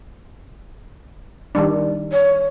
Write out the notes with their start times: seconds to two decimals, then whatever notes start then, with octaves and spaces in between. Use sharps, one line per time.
1.55 D#3 G3 D4
2.12 C#5